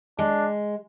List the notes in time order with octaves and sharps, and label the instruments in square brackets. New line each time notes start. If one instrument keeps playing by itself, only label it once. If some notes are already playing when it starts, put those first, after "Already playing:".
[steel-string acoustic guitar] G#3 [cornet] D4